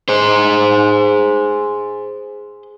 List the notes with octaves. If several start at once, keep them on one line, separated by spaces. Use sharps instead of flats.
G#4 C5